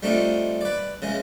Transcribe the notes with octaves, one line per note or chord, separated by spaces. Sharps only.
G3 A3 C4 D4 D#4 F4
B4 D5
C#3 E3 G#3